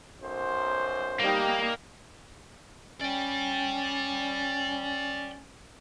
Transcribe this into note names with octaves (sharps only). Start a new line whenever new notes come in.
B1 F#2 C5
G3 A#3 D#4 G5
C#4 D5 G5